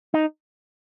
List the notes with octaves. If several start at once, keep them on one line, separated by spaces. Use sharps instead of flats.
D#4